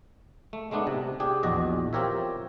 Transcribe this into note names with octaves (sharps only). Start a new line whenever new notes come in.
A3
G#3 A3 B3 D4 D#4
C3
D4 G4 G#4
A#1 E2 F#4 D5 D#5
C4 F4 G4 A#4 C#5 E5